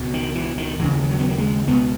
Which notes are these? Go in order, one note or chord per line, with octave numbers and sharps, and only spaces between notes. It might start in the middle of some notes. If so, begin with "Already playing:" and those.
Already playing: C#2 B2
D#3
E3
D#3
D#2 C#3 E3
E3
F#3
B3
A#3
G#3
C#2 B2 B3